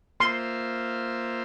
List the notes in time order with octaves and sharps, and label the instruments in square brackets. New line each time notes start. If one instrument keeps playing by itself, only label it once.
[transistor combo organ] A#3 F4 C5 E5 [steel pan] C6